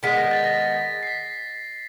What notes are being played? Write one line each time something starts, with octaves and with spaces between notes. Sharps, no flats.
D#3 G#3 B3 B6
A#6
A6
A#6
C7
B6